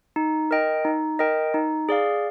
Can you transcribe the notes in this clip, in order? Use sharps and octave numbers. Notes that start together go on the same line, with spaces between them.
D#4
A#4 D#5 G5
D#4
A#4 D#5 G5
D#4
G#4 D5 F5